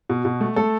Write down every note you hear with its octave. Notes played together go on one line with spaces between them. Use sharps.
B2
B2
A3
A3 A4